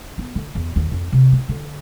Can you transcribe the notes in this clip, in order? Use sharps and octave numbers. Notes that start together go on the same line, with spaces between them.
B3
D3
E2
D#2
F2
C3
C4
D3